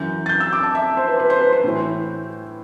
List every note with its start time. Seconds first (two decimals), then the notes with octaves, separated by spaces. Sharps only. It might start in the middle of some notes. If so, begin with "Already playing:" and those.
Already playing: F#2 E3 G6
0.26 A6
0.29 G6
0.40 E6
0.53 D6
0.63 A5
0.75 E5
0.97 C5
1.08 B4
1.20 B4
1.30 C5
1.41 B4
1.52 C5
1.64 A2 E3